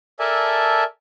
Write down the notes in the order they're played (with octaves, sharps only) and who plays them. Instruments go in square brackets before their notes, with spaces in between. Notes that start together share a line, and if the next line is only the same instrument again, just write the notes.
[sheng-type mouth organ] A4 A#4 D5 E5 G#5 A5